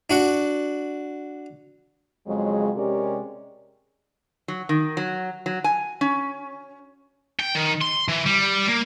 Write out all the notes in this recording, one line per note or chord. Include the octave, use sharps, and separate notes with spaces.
D4 F#4 F#5
F2 C#3 F#3 G#3
C3 G#3 C#4 G4 A#4 D5
F#3
D#3
F#3
F#3
G#5
C#4
G5
D#3
C6
E3
G3
A#3